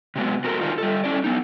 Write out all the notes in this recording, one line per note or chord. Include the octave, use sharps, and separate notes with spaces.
C3 F#3 G#3 B3
F#4 A4 A#4 C5
D#3 G3 D4 D#4 F4
G3 A4
C#4 E4 D5
B3 D#4